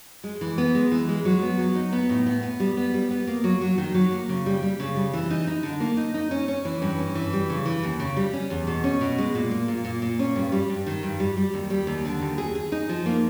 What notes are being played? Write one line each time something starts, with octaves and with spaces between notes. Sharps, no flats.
G#3
E3
B3
G#3
E3
G#3
F#3
B3
F#3
D#4
B3
A2
B3
B3
G3
B3
G3
B3
A#3
F#3
F#3
D#3
F#3
A#3
C#3
G3
G3
C#3
G3
E3
D#4
D#4
D3
A#3
D#4
D#4
C#4
C#4
E3
G2
C#4
E3
G3
C#3
E3
D#2
C#3
G3
C#4
E2
B2
C#4
B2
G#3
A#2
A#3
A#2
A#2
A#2
C#4
G2
G3
G2
D#3
G2
G3
G3
D#2
G3
D#2
D3
D#2
G#4
G#4
D#4
F3
A#3